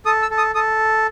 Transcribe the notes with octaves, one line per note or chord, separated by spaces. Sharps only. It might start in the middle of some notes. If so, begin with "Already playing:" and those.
A4 D#6
E6
A4
D#6
A4 D#6